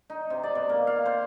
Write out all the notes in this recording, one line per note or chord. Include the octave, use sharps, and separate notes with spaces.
D#4
C3
D5
B2
A#3
F5
C5